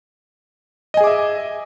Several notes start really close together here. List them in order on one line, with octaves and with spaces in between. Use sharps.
D#5 G#5 G#4 D6 E5